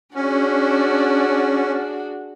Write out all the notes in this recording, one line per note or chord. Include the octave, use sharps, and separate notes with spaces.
C#4 D4 F#4 G#4